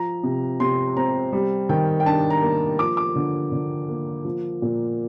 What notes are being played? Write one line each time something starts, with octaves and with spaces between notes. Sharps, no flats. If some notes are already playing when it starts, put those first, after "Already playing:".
Already playing: F3 A#5
C3
C3 C6
C4 A#5
G3
D#3 G5
G5
D4 A5
A#5
A#3
F3 D6
D6
D3
D3
A#3
F3
A#2